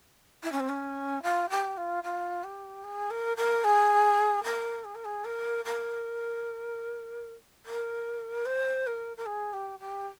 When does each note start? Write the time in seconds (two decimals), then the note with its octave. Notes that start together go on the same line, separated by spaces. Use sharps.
0.43 E4
0.52 C#4
0.60 C4
0.69 C#4
1.22 F4
1.49 G4
1.77 F4
2.03 F4
2.43 G4
2.83 G#4
3.10 A#4
3.37 A#4
3.64 G#4
4.43 A#4
4.84 G#4
4.95 A#4
5.04 G#4
5.24 A#4
5.64 A#4
7.65 A#4
8.45 C5
8.86 A#4
9.17 A#4
9.26 G#4
9.53 G4
9.79 G4